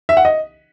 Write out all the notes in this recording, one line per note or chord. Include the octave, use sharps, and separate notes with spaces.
E5
F#5
D#5